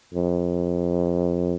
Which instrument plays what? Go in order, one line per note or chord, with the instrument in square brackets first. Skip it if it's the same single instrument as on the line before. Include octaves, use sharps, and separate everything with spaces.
[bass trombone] F2